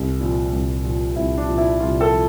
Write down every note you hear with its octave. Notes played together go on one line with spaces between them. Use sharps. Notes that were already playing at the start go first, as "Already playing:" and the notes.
Already playing: C2
A#2 F3
C2
A#2 F3
C2 E4
D4
A#2 F3
E4
C2 F4
A4
F3